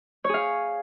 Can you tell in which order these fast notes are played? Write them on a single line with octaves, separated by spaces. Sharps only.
C#5 G#4 F5